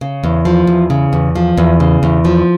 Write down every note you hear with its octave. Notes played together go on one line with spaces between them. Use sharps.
C#3
E2
F3
E2
C#3
E2
F3
E2
C#3
E2
F3